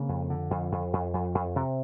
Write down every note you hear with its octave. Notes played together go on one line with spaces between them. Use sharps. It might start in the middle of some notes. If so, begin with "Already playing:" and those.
Already playing: C#3 A#3 C4
F2
D3
F2
F2
F2
F2
F2
C3